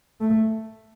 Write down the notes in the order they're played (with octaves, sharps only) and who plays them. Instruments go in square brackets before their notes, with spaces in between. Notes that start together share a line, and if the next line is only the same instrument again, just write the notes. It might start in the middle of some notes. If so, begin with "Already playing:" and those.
[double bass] A3